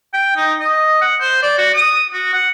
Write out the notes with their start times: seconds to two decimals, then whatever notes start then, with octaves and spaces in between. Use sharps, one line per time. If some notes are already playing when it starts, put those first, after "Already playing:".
0.13 G5
0.36 D#4
0.60 D#5
1.01 F#5
1.21 C5
1.42 D5
1.58 F#4
1.74 D#6
2.13 F#4
2.33 F#5